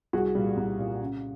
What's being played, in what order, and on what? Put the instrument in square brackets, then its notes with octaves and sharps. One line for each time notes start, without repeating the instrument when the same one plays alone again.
[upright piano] C2 F#4 G#4
A#2 G3
C2
A#2 G3
C#3